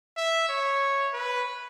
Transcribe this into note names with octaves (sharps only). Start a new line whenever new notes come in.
E5
C#5
B4